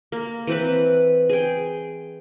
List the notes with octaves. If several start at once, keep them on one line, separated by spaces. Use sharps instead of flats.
A#3
E3 C4 B4
G#4 G5